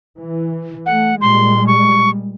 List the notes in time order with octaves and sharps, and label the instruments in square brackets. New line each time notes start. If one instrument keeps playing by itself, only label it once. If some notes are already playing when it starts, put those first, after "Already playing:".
[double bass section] E3
[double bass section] A3 [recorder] F#5
[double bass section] A#2 G3 G#3 [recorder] C6
[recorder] C#6